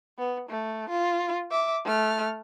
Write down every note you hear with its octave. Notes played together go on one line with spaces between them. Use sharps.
B3
A3
F4
E5 D6
A3 F6